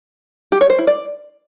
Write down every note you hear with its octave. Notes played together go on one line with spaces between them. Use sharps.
G4
C#5
C5
E4
D5